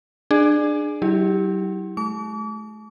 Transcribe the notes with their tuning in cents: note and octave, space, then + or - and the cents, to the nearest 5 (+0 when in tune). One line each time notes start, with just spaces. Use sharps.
D4 +25 G#4 +0
F#3 +40 E4 -20 G4 +5
A3 -40 D6 -40